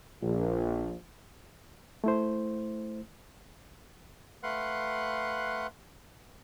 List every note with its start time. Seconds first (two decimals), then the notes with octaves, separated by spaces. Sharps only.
0.22 A#1
2.04 A3 E4 C5
4.43 A3 B4 F5 F#5 C6 F#6